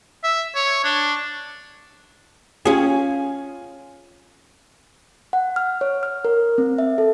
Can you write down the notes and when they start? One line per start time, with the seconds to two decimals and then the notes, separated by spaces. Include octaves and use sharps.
0.23 E5
0.55 C#5
0.84 D4
2.65 C#4 F4 G#4 G#5
5.33 F#5
5.56 F6
5.81 C#5
6.03 F6
6.25 A#4
6.58 C4
6.78 E5
6.98 A4